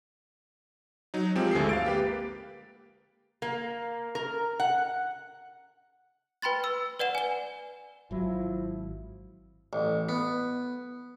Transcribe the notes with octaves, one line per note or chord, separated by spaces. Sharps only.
F#3 D#4
F3 G#3 C4 G4
G1 D2 G#3 A4 C7
F5 A6 D7
A#3 G4 B4
A#3
A#4
F#5
B4 G5 B5 C6 A6
E6
B4 D5 F#5 E7
G#5 G7
G#1 F3 F#3 E4
A1
B3